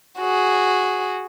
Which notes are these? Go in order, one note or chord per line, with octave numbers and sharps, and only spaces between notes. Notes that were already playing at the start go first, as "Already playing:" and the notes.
F#4 G#4